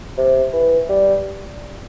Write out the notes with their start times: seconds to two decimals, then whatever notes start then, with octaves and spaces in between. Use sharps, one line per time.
0.17 C3
0.53 E3
0.89 G3